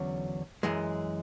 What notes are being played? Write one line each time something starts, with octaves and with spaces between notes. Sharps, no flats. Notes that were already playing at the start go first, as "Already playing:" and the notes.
Already playing: E2 D3 F#3 C#4
F#2 E3 G#3